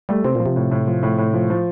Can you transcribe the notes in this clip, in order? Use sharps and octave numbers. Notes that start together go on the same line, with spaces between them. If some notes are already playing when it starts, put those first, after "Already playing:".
G3 A3
C3 C4
A#2 F3
C3
A2
A2
F3
A2
A2
F3
F3